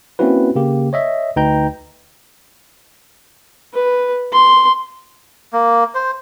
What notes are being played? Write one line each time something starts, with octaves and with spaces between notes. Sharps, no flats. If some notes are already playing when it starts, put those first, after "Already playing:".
A#3 C4 C#4 E4 F#4 B4
C#3 A#3 G4
C#5 D#5 E5
D2 D#4 B4 G5 A#5 G6
B4
C6
A#3
C5